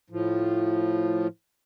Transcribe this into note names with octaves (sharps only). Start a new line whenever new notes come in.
A2 F3